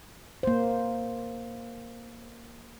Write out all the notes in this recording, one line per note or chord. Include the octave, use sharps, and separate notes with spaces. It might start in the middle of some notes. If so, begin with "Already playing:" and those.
A#3 C5